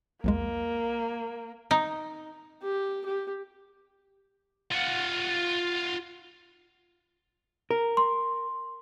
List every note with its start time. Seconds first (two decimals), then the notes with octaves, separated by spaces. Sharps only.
0.24 B1 E2 G#3 A#3
1.71 D#4
2.62 G4
3.06 G4
4.72 F4 F#5
7.71 A#4
7.97 C6